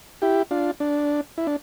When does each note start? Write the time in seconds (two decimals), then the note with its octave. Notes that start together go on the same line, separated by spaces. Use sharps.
0.22 E4 G4
0.51 D4 F4
0.80 D4
1.38 E4
1.47 D4